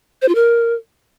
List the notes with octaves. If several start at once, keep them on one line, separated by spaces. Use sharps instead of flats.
C5
F4
A#4